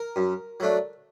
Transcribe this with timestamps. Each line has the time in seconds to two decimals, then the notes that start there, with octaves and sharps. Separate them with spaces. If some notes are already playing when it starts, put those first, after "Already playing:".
Already playing: A#4
0.16 F#2
0.60 F#3 A3 D4